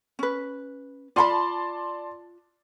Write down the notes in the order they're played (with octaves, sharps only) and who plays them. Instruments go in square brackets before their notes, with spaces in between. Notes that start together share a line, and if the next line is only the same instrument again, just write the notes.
[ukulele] C#4 B4
[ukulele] F4 F#5 B5 [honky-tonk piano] D5 A5 C6